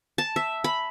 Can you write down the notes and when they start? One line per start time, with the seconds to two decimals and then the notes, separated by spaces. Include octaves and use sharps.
0.18 A5
0.36 E5
0.64 B5